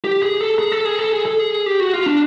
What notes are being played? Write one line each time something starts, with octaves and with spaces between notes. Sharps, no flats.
G4
G#4
A4
G#4
A4
G#4
A4
G#4
A4
G#4
G4
F#4
F4
D4